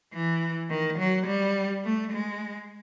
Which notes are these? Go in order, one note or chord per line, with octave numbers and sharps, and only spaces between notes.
E3
D#3
F#3
G3
A3
G#3